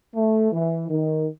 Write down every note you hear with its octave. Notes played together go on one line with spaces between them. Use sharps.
A3
E3
D#3